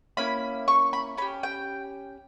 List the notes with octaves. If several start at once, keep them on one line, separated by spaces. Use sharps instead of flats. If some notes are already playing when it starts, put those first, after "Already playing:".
A#3 C#4 E4 B5
C#6
B5
C#4 G4 B5
G5